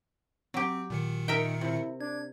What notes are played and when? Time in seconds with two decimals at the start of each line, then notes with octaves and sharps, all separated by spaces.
0.54 F#3 C4 G4
0.90 A#2 D#3 C#7
1.28 D#4 A#4 E5 G5
1.61 C3 E4
2.01 D4 G#6